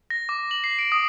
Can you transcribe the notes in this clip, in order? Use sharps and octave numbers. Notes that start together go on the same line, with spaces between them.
A#6
D6
F#7
C7
D7
D#6